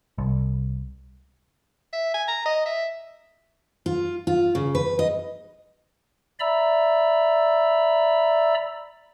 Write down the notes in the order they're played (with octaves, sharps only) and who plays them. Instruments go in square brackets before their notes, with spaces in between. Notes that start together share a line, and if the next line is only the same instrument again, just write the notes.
[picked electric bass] C2
[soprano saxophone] E5
G#5
A#5
D#5
E5
[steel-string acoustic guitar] F4
F4
C#3
B4
D#5
[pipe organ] D5 E5 A#5 B5 E6